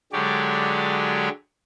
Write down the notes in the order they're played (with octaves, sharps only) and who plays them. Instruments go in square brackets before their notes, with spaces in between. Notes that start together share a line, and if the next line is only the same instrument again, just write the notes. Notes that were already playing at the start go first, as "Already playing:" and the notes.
[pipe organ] D3 F#3 G#3 G4 C#5 D5